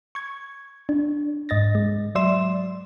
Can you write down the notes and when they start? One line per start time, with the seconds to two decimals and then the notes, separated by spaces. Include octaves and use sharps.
0.15 C#6 G#6
0.89 D4
1.49 G#2 D#5 A6 A#6
1.75 G#3
2.15 F#3 D5 E5 C6 E7